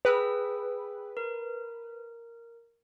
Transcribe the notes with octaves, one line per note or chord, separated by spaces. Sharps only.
G#4 B4 G5 E6
A#4